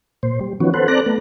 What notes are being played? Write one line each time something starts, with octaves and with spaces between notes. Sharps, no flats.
A#2 C5
G3
D#3 F3 B3 C#4 F#4
A4 B4 C5 F#5
C4 A4 D5 A#5 F#6
A3 B3